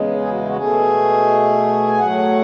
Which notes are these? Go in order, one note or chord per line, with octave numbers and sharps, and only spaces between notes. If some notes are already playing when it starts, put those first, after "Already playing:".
Already playing: E2 C#3 G#3
G#4
F#4
E4
F#4
B2 A3 G#4
G#5
A2 F#3 A3 F#5